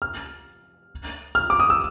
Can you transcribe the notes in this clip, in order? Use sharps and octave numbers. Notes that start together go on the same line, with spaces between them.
F6
F6
D6
D#6
E6